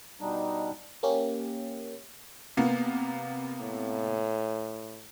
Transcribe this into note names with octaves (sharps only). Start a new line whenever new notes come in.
B2 G3 D4 D#4
A#3 C#4 G4
C3 A#3 B3
A2